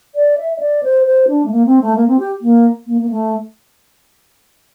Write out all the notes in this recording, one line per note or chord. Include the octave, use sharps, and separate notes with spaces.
D5
E5
E5
D5
C5
C5
D4
A3
A#3
C4
A3
A#3
C4
G4
A#3
A#3
A#3
A3